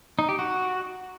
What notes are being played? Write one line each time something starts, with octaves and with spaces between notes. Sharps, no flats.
D#4
G4
F#4